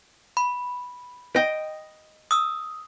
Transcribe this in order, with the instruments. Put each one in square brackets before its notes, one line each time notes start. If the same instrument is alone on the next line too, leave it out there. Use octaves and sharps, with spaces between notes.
[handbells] B5
[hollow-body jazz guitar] D#5 G5
[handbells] D#6 E6